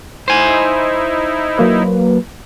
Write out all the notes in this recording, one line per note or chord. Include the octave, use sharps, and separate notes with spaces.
D#4 E4 C5 G#5
F#3 A#3 B4